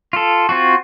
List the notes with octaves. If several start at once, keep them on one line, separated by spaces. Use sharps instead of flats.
F4 A4
C4 F4 F#4